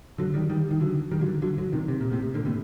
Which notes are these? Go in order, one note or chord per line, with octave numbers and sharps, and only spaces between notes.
D3 F#3
D#3 G3
D#3 G3
D#3
D3 F#3
D#3 G3
D3 F#3
D3 F#3
D3 F#3
C3 D#3
C3
A#2
A2 C3
A#2 D3
A2 C3